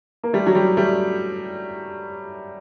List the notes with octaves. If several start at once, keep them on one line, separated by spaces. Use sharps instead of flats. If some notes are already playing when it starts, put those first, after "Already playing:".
A#3
G3 A3
F#3
G3
G3 A3